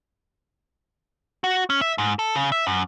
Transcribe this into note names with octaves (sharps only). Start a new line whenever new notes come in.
F#4
C#4
E5
G#2
A4
C#3
E5
F#2